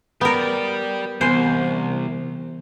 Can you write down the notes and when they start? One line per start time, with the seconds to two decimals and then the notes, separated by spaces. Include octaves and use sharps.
0.21 B3 G4 A#4 D5
1.21 C2 E3 B3 C5 G#5